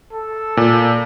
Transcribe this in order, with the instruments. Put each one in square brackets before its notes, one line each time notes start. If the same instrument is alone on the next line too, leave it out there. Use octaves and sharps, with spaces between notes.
[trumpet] A4
[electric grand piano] A#2